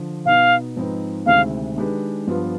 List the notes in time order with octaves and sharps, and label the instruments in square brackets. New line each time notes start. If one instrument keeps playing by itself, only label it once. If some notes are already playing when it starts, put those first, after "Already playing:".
Already playing: [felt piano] D3 F3
[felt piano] B2 B3 D#4 [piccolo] F5
[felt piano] G#2 F3 C4 D#4 B4
[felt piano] D2 C3 D#3 G#3 C4 [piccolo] F5
[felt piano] D#3 G#3 D4 G4 B4
G2 F3 B3 D4 F4